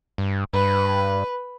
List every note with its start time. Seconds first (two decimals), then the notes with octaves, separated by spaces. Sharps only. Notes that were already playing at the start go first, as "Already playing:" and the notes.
0.18 G2
0.54 G2 B4